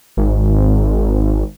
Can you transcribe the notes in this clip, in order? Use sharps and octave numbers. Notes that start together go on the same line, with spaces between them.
G#1